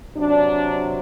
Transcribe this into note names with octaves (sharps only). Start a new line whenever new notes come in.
C3 F#3 D4